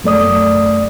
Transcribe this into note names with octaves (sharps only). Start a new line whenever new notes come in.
F#2 A3 D5 D#6